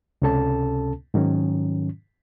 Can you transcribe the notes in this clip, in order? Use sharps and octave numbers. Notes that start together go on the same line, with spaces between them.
C#2 C3 C#4 A4 A5
G#2 D#3 F#3 C#4